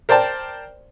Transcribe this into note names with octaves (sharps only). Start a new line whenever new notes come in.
A#4 C5 D5 G5 A5